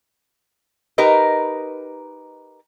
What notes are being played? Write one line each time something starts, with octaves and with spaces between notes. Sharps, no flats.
D#4 G4 A#4 B4 D#5